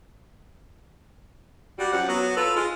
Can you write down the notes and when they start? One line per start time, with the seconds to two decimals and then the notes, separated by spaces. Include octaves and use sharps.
1.79 G3 F#4
1.93 F#2 F3 F#3 F#5
2.09 F#3 B3
2.37 F4 A4 B4
2.56 G#3 F4